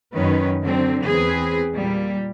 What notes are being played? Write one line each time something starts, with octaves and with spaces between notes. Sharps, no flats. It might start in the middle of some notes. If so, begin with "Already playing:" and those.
F#2 D#3 C#4 B4
D3 F#3 C4
E2 C4 G#4 B4
A#2 G3